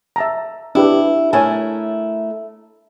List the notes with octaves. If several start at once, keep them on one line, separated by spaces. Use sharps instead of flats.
E5 A5 A#5
D4 E4 G4 B4
A3 E4 A#4 C#5 G#5 A5